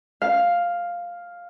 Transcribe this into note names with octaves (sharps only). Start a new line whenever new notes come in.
F5